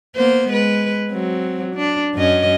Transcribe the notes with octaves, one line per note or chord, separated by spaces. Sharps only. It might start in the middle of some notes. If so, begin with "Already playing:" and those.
A#3 B3 C5
G#3 B4
F#3 C4
D4
F#2 C#4 D#5